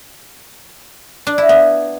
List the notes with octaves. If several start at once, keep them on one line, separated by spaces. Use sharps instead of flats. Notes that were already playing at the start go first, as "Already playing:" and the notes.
D4
E4
B3